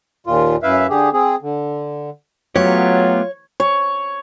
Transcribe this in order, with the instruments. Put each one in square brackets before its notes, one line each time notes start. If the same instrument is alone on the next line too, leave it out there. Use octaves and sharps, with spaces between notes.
[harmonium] D#2 A#2 F4
F#2 E4 B4 E5 F5
D3 G4 G#4
C4 G#4
D3
[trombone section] F#3 [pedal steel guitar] A3 B3 G4 [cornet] F4 [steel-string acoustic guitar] C#5
[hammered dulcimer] C#5